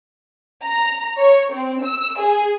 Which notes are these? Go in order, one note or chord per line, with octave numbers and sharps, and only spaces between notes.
A#5
C#5
C4
E6
G#4